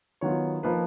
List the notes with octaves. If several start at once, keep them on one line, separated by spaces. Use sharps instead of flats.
D#3 F#3 B3 F4 C#5
F3 A#3 D#4 B4